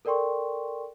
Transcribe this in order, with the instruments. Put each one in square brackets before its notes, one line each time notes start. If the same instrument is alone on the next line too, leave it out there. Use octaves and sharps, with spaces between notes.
[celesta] A4 A#4 D5 G5 C6 C#6